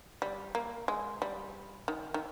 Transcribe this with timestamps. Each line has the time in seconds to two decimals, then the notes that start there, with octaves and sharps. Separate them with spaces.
0.22 G3
0.55 A#3
0.88 G#3
1.22 G3
1.88 D#3
2.14 D#3